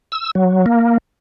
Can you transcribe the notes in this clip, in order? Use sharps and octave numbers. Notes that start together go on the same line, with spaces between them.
E6
F#3
A#3